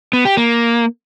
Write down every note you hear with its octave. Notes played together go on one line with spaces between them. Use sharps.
B3
G4
A#3